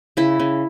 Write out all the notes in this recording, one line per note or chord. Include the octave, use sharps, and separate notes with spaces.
C#3 E4
C#3